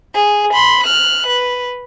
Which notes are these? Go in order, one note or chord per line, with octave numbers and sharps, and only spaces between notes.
G#4
B5 C6
F6 F#6
B4